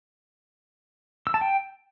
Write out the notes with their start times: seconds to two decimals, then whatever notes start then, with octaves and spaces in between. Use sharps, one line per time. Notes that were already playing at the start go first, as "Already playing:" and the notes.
1.27 E6
1.34 A5
1.41 G5